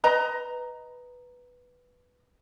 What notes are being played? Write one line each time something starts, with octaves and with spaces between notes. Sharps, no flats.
B4 D#5 A#5